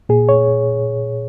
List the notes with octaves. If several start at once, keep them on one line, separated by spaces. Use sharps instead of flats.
A#2 G#4
C#5